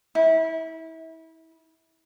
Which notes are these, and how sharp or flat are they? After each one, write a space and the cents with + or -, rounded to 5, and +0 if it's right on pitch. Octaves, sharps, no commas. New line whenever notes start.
E4 -30